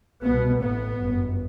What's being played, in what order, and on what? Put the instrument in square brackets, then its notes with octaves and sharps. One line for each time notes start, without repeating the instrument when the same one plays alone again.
[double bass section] C2 B2 B3
A1 A2 B3
G1 F#2